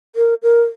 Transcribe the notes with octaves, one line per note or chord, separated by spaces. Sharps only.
A#4
A#4